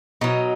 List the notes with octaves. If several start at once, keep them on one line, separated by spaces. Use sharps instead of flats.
B2 F#3 D#4